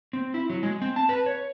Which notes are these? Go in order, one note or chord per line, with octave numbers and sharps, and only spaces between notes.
C4
E4
F#3
G#3
C4
A5
B4
C#5